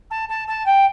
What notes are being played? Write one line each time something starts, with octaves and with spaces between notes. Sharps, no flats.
A5
A5
A5
G5